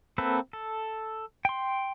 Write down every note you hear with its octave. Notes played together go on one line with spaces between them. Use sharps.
A#3 C4 A4 B4
A4
G5 C6